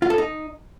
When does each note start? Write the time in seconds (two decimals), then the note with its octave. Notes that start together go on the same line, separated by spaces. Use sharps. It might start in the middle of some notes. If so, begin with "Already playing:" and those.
0.02 F4
0.10 A4
0.18 D#4